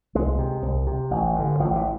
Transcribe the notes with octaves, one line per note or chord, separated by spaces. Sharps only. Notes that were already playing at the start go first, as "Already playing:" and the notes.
C2 G#3
C3
C2
C3
A1
G2 D3
A1 F3
E3